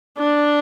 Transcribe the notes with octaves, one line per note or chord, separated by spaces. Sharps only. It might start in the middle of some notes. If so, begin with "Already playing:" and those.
D4